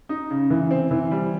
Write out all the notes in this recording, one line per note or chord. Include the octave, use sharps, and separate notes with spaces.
D#4
C#3
E3
C4
E3
G3